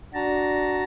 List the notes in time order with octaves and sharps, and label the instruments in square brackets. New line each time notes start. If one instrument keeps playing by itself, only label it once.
[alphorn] D4 [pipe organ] F#4 A5 A#5